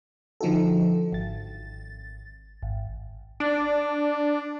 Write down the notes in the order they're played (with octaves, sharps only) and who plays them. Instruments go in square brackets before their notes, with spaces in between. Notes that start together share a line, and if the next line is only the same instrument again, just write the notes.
[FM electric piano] D3 F3 D#4 F#4 A4
G#1 A6
G#1
[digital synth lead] D4